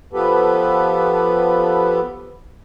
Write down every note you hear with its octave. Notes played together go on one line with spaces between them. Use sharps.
F3 B3 G4 A4 B4